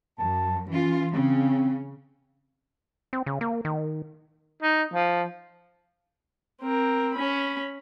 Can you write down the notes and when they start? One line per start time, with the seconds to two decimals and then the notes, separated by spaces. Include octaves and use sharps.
0.19 F#2 A5
0.71 E3 C#4 F4
1.13 C#3 C4
3.13 C4
3.26 C#3
3.41 A#3
3.65 D#3
4.62 D#4
4.93 F3
6.62 C4 A#4
7.15 C#4 B5